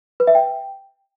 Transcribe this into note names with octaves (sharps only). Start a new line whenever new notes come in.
B4
E5
G5